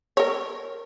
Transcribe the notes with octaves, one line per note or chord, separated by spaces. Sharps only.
A#4 C#5